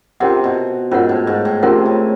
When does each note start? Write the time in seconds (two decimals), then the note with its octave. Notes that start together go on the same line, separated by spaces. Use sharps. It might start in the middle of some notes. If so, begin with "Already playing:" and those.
0.20 C3 C#4 F4 A#4 C#5 F#5
0.44 B2
0.91 G#2 C#4 F4 A#4 C#5 F#5
1.09 A2
1.27 G#2
1.45 A2
1.63 C3 C#4 F4 A#4 C#5 F#5
1.86 C#3